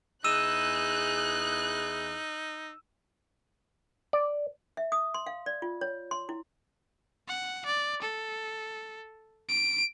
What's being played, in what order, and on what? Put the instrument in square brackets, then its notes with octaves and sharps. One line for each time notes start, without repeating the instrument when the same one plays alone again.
[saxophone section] E2 E4 G#4 [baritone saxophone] D#4 [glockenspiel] E6 D#7 E7 [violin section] F#6
[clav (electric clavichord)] D5
[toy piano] E5
D#6
C6
F5
D5
F4
C#5
C6
E4
[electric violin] F#5
D5
A4
D7